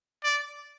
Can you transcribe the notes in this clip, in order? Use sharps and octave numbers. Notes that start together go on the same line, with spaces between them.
D5